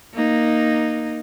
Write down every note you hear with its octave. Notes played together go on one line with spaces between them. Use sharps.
A#3 D#4